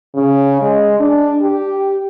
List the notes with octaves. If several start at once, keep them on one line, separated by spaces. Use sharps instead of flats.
C#3
G#3
D4
G4